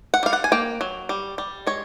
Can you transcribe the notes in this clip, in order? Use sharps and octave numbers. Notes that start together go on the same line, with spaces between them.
F#5
G3 F5
F#5
G#5
A#3 G5
F#3
G3
G3
G#3 C#5